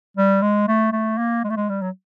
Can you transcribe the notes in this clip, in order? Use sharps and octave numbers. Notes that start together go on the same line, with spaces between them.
G3
G#3
A3
A3
A#3
G#3
A3
G#3
G3
F#3